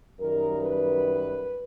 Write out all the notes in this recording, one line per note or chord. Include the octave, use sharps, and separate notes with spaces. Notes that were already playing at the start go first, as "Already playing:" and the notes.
F#2 D#3 G3 A#4
B4